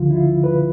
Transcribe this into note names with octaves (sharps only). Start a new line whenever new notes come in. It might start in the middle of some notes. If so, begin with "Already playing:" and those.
Already playing: D2 D3 F3 F4
E4
F4
B4